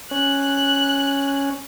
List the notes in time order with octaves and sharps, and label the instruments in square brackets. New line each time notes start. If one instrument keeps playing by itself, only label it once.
[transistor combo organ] C#4 [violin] F#6